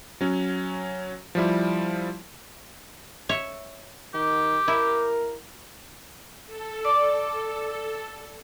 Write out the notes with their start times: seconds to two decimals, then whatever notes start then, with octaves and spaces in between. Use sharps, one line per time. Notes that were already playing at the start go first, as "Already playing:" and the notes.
0.21 F#3 C#4
1.35 F3 G3 E4
3.29 C#5 E5
4.14 D#3 G4
4.68 E4 A#4
6.46 A4
6.84 D5